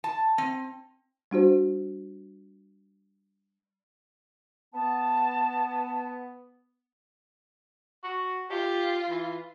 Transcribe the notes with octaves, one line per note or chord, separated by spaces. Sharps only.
A5
C4
G3 D4 F#4 C5
B3 A5
F#4
F4 G4
E3